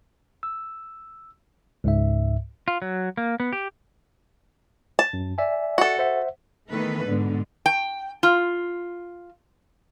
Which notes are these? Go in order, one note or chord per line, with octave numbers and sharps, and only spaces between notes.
E6
C#2 G#2 E5
F4
F#3
A#3
B3
G4
A5
F#2
D5 E5 G#5
F#4 A4
C5 E5 F#5
D#3 E3 A3 B3 A4 B4
G#2 B2 D3 B3
G5
F4